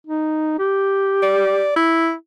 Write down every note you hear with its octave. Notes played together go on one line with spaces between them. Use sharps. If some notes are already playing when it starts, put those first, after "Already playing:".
D#4
G4
D5
E4